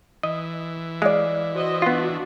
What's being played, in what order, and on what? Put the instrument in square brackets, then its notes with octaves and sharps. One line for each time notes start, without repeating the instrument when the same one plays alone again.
[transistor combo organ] E3 [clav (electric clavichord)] D#5
[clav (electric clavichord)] G#3 [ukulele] D5 F5
[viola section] F#4 C5 D#5
[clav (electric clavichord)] B3 F4 [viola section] D4 F#4